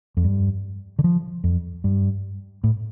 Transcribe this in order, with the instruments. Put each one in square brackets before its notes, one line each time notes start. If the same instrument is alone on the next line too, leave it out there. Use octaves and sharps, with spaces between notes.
[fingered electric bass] F2
G2
D3
F3
F2
G2
A2